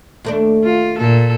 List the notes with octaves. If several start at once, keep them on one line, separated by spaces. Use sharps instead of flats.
D#2 A3 D4
F4
A#2 A4